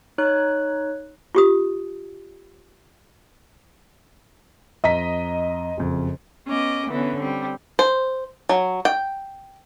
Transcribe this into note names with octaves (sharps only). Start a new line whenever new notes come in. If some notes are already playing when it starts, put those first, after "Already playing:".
D#4 C#5 F#6
F4 G4 D#6
F2 D#5 A#5 B6
F#1 F2
B3 C#4 D#5 D6
D3 E3 B3 C#4
G3 C4
C5
F#3
G5